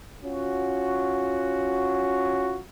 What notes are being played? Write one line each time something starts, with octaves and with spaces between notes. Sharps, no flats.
C#4 F4 F#4